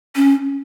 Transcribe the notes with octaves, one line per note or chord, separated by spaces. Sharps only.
C#4